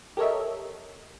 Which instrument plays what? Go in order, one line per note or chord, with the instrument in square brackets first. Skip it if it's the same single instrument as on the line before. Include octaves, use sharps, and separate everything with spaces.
[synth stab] G4 A4 A#4 C#5 D#5 E5